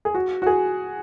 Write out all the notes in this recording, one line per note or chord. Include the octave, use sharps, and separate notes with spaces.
G#4
F#4
F#4
G#4